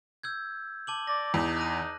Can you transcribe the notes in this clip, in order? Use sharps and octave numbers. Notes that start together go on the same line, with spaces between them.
E6 G6 G#6
A5 D6 F#7
D5 A#6
E2 D#4
F#6 A#6 D#7